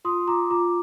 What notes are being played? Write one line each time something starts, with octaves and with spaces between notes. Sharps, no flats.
F4 C6 D#6
F4 A#5 D6
F4 A#5 D6